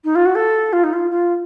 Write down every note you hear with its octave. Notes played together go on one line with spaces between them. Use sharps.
D#4
F4
F#4
A4
F4
D#4
F4
F4